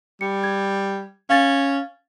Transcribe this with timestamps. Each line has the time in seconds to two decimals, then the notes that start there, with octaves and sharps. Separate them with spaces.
0.21 G3 C#7
0.44 G#6
1.30 C#4 F5 A6